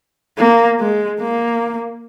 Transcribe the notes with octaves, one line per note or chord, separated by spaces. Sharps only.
A#3
G#3
A#3